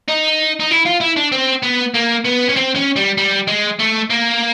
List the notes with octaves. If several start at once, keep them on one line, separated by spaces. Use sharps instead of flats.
D#4
D#4
E4
F4
E4
D4
C4
B3
A#3
B3
C#4
C4
C#4
G3
G3
G#3
A3
A#3